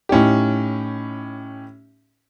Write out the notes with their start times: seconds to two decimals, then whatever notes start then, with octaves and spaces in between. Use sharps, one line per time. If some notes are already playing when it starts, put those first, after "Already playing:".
0.09 A2 C#4 D#4 G4